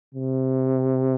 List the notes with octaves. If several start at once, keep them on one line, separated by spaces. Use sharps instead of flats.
C3